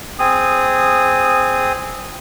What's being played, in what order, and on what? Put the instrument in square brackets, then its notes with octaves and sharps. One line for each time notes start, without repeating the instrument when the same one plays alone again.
[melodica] C4 G#4 D#6